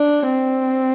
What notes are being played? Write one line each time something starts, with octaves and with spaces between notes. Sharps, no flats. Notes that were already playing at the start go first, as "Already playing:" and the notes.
Already playing: D4
C4